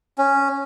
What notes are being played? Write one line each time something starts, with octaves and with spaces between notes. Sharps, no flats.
C#4